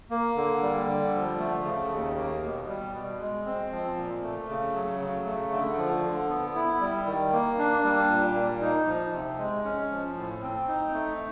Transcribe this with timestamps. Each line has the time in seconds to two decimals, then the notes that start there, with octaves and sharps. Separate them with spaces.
0.11 A#3
0.36 D3
0.62 G3
0.88 D3
1.14 F3
1.39 A3
1.65 C#3
1.91 D#2
2.16 A#3
2.42 B2
2.68 G3
2.94 B2
3.19 G#3
3.45 C4
3.71 F3
3.97 A#2
4.22 A3
4.49 C#3
4.75 F#3
5.00 C#3
5.26 A3
5.52 D3
5.78 F3
6.03 D3
6.29 B3
6.55 E4
6.81 G3
7.07 D#3
7.33 A#3
7.59 D4
7.84 G3
8.09 A#2
8.35 A#3
8.61 D#4
8.86 F3
9.13 C3
9.38 G#3
9.64 C#4
9.90 F3
10.16 A2
10.42 C4
10.67 D#4
10.93 A3